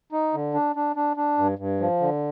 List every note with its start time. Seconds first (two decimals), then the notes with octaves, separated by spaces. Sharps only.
0.12 D#4
0.34 D3
0.54 D4
0.76 D4
0.96 D4
1.17 D4
1.38 G2
1.59 G2
1.80 F3
2.01 D3